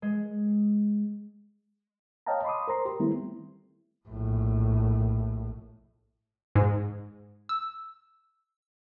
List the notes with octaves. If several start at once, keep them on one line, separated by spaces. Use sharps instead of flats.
G#3
C#5 D#5 F5 G5 A5 A#5
B5 C6 D6 D#6
A#4 C5 A#5 C6
G4
D#3 G3 A3 B3 C4 E4
A#1 A2
G#2
E6